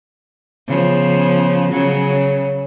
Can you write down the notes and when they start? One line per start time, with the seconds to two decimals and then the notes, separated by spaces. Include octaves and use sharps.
0.68 C#3 F3 B3
1.71 C#3 F#3